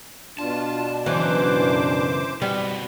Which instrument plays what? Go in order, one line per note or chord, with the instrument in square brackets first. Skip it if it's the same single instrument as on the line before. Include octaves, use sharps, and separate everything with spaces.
[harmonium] B2 D4 [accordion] F4 [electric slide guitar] A5
[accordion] F#2 C5 D6 [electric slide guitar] C#3 F#3 B3 [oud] E3
[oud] G3 [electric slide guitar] C4 F#4 B4